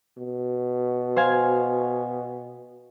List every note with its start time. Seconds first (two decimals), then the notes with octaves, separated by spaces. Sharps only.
0.17 B2
1.16 C5 F5 G#5